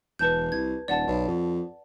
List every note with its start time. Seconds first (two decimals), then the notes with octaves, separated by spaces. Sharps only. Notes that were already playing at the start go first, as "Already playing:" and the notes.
0.19 E1 B4 A5 G6
0.52 C2 G#6
0.88 D#1 D5 F#5 A5
1.07 B1
1.28 F2